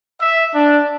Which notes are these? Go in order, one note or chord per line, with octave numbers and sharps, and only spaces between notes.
E5
D4